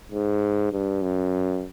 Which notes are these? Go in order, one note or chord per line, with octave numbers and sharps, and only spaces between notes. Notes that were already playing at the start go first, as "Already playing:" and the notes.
G#2
G2
F#2